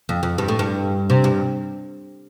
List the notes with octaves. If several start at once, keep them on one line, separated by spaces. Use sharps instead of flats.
F2
F2
G2
A2
G2
C3
G2